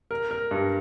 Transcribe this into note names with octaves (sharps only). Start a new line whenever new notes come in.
A#4
A#4
G2